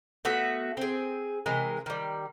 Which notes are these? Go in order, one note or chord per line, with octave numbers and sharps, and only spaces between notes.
A3 B3 F#4 E5
C4 G#4
C3 E3 G#3 A#4
D#3 G3